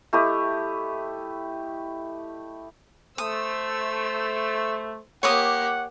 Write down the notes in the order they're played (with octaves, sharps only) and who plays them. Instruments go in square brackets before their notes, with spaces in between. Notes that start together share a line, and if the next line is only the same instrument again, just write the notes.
[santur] A3 E4 G4 D#5
[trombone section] A3 [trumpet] C5 [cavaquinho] D#6 [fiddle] E6
[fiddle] A#3 G4 [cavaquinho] C#5 D6 D#6 [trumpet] F#5